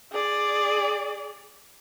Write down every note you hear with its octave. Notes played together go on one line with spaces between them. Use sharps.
G#4 D5